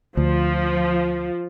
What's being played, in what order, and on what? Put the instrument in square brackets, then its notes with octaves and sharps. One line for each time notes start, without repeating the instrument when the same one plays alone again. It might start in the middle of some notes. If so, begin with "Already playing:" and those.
[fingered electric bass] D2 [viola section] F3